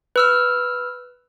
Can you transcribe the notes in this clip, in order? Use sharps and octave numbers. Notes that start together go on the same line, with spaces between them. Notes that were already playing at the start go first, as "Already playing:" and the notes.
B4 E6 F6